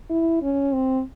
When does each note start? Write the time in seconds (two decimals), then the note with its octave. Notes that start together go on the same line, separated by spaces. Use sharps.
0.10 E4
0.42 C#4
0.73 C4